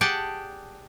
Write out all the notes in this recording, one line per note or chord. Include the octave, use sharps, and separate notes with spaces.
G4 G#4 D5 F#5 G5 A5